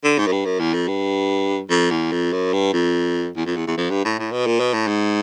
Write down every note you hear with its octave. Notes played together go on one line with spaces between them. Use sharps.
D3
G#2
F#2
G2
F#2
E2
F2
G2
F2
E2
F2
F#2
G2
F2
E2
F2
E2
E2
F2
G2
A2
A2
B2
A#2
B2
A2
G#2